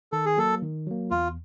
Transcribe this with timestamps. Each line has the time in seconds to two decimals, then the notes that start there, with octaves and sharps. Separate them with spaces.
0.12 D#3 A4
0.26 G#4
0.37 F#3 A#3 A4
0.62 D#3
0.87 F#3 A#3
1.11 E2 F4